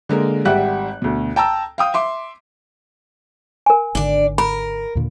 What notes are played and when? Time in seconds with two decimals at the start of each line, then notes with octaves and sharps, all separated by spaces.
0.09 D3 G#3 A#3 A#4
0.45 G#1 G3 G4 E5 F#5 F#6
1.02 D2 B2
1.36 G5 A5 A#5 E6
1.78 F5 G5 D#6
1.94 E5 C6 D6
3.66 A#4 G#5
3.95 G#1 D3 D4 D5
4.38 A#4 B5
4.95 D#2 A#2 D3